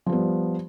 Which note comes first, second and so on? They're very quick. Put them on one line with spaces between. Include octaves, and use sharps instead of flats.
F3 G3 B3